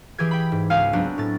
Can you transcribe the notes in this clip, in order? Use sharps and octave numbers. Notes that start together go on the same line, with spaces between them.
E3 G4 G#4 G#6
G5 B5
G#2
C#2 F5 G#5 F6 C7
F#3 B3 C4 D4
A2 A6